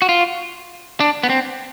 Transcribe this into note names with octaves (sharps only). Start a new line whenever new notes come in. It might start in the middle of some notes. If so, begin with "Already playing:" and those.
F#4
F4
D4
B3
C4